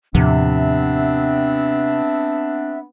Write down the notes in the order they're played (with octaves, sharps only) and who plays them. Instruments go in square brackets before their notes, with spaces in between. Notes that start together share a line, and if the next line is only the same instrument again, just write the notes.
[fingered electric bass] D#2 A2 F3 [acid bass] C3 [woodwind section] B3 C4 D4 [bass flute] E5